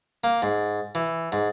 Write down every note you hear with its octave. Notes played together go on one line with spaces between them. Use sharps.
A#3
G#2
E3
G#2